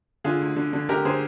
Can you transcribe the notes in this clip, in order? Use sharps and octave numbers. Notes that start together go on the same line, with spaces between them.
D3 F4 G#4
D2
D3
D3
D3 G4 A#4
D3 G#4 C5